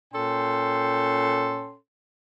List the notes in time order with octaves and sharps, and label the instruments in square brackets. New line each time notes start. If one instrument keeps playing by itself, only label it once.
[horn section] A#2 C#4 A4 G5 C6